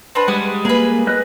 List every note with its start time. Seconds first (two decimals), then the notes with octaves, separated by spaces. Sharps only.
0.15 C4 D4 B4
0.28 G3 G#3 F#5
0.65 A#3 G#4 B4
1.07 B4 D#5 F#6